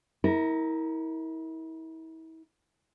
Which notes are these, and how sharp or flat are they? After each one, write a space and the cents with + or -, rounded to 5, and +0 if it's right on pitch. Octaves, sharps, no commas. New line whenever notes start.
E4 -35 A#4 +0